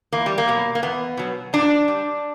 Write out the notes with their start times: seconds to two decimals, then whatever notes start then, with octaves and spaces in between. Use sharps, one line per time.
0.12 E2 A#3
0.26 G3
0.38 A#3
0.48 B2 F#3
0.75 A#3
0.83 E2 B3
1.17 B2 F#3
1.53 A#2 D4
1.88 G3